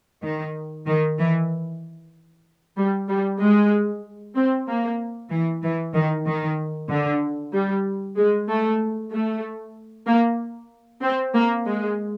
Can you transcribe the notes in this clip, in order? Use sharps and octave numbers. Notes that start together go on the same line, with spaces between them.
D#3
D#3
E3
G3
G3
G#3
C4
A#3
E3
E3
D#3
D#3
D3
G3
G#3
A3
A3
A#3
C4
A#3
G#3